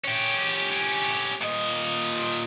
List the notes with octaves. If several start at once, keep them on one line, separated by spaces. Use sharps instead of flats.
C#4 G4
A#2 D#5